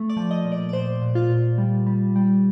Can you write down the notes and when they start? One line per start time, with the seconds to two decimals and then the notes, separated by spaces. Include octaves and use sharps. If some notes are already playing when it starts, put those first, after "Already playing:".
Already playing: A3
0.10 D5
0.17 F3
0.31 D#5
0.45 A#2
0.52 D5
0.69 D5
0.73 A#2 C5
1.02 A#2
1.15 F4
1.30 A#2
1.58 G3
1.86 G3
2.16 G3